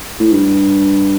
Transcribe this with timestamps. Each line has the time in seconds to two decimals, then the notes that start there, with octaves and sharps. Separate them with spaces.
0.20 A2
0.31 G2